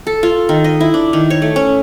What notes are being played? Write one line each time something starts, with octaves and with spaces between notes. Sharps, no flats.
A4
F4
D#3
D#5
E4
D4
D#3
C#5
A3
C#4